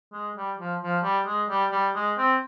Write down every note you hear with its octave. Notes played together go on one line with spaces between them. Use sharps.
G#3
G3
F3
F3
G3
G#3
G3
G3
G#3
C4